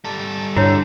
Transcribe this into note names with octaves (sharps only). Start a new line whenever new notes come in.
G3 A4
G2 D3 E4 C#5